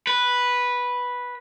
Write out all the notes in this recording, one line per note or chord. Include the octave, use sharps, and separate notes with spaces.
B4